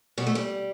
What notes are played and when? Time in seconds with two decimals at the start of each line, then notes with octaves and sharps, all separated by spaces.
0.17 B2 G3
0.27 A3
0.35 G3